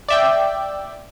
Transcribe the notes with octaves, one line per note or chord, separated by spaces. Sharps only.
D5 E5 G5